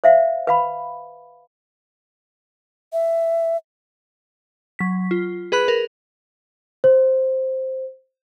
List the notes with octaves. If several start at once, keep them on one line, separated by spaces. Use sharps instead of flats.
C5 E5 F5
B4 F5 B5
E5
F#3 B6
F4
G#4 B4 B5 F#6
A#4
C5